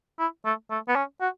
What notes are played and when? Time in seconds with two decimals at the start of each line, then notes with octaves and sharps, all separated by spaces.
0.19 E4
0.45 A3
0.70 A3
0.88 B3
0.95 C#4
1.21 F#4